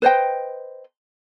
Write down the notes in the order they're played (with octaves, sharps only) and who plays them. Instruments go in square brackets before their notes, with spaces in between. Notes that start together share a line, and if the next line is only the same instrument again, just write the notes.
[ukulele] B4 C5 D#5 G5